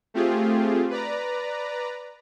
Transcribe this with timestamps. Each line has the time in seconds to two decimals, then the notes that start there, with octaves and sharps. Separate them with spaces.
0.14 A3 C4 F4 G4 G#4
0.90 B4 D5 A#5